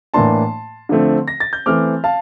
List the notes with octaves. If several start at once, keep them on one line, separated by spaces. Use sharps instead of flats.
A2 E3 A#3 D4 A5 C6
D3 F3 A3 C4
A#6
A6
G6
E3 A3 C4 D6 F6
F5 A5